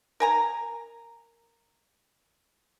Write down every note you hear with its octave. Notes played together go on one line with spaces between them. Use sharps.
A#4 G#5 A#5